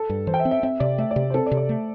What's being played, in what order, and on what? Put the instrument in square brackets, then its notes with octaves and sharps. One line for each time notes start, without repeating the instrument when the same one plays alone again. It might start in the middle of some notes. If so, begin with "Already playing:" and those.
Already playing: [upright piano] A4
[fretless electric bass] G2
[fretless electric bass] E3 [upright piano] C5
[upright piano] G5
E5
[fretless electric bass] C4
[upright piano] E5
[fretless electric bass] C4 [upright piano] E5
[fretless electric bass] C3 [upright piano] D5
[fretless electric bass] A3 [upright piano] E5
[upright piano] D5
[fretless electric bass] C3
[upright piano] C5
[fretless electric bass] C4 [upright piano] A4
[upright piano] D5
[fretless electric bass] C3
[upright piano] D5
[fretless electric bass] A3